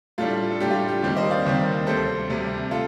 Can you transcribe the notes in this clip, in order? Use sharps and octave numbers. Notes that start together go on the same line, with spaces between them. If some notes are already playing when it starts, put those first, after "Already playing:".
A2 G3 D4 F4 A4
A4
A2 G3 D4 G4
F4
G4
G4
D#2 D#3 G3 C4 G4
C5 D#5
D5 F5
D#2 D#3 G3 C4
D2 C3 G3 A4 C5
D2 C3 G3
F4 A4